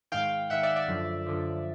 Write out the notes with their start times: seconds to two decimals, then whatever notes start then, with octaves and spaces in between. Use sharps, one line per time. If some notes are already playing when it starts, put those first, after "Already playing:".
0.12 G#2 D#3 F5 G5
0.50 G#2 D#3 E5 F#5
0.63 D5 E5
0.76 D5 E5
0.88 F#2 D3 F3
1.27 F#2 D3 F3